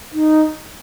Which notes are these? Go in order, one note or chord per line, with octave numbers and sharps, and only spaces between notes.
D#4